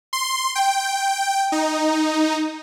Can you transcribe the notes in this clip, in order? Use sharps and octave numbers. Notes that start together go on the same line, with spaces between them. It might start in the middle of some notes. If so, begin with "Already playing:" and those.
C6
G5
D#4